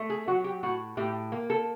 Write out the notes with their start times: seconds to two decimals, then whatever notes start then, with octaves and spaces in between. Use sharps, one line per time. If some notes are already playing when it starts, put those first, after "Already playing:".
Already playing: A3
0.10 G#4
0.28 F#3 F#4
0.44 G4
0.63 A2 F#4
0.97 A2 G4
1.32 A#3
1.50 A4